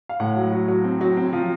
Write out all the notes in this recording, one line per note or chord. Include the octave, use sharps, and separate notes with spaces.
F5
A2 F#5
F#3
F#3
F#3
C4
F#3
C4
F3